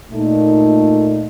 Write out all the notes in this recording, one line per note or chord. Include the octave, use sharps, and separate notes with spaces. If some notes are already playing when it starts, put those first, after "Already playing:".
A#2 A3 D#4